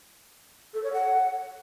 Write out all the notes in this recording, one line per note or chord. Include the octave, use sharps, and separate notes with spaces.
A4
C#5
F#5